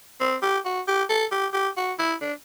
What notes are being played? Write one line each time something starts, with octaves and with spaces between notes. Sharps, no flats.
C4
G4
F#4
G4
A4
G4
G4
F#4
E4
D4